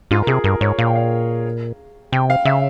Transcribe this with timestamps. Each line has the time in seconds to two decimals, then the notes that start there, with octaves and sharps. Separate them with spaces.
0.11 G#2 F4
0.23 A#4
0.27 C3 G#4
0.44 G2 A#4
0.61 G#2 C#5
0.78 A#2 F5
0.87 G5
0.95 F5
2.12 C3 G5
2.30 F5
2.45 C#3 E5